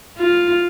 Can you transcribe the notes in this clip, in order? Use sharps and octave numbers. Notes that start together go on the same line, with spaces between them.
F4